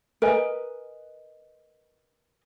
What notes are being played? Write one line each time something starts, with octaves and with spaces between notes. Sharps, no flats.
A#4 B4 D#5 G#5